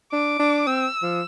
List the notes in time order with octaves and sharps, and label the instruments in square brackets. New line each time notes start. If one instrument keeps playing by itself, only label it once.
[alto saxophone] D4 [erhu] D6
[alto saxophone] D4
[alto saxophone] C4 [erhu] E6
[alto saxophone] F3